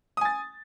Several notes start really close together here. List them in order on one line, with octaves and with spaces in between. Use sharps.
D#6 G#5 A6